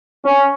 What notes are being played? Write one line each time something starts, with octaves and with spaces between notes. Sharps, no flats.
C#4